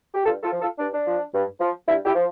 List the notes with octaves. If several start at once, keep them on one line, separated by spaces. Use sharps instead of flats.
G4
G2 F4 A4
F4 A4
F3
F4 A4
G2 D4
D4
F3
G2
F3
G2 E4
E4 G4
F3